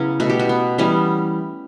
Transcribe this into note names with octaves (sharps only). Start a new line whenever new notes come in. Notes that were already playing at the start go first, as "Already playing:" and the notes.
Already playing: C#3 F#3 B3 C#4 E4
B2 A3 F#4
G4
F#4
B3
E3 G3 B3 C#4